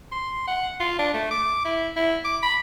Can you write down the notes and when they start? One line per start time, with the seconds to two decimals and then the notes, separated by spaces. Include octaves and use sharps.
0.12 C6
0.48 F#5
0.80 F4
0.99 D4
1.14 A3
1.31 D6
1.65 E4
1.97 E4
2.24 D6
2.43 B5